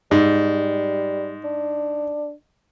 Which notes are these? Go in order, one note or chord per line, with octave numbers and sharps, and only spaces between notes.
G#2 G3
D4